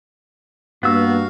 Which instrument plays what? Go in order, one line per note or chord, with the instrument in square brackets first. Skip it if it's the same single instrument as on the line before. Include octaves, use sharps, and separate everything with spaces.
[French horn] G2 [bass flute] A#3 [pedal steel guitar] B3 E6 [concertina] F#4 F5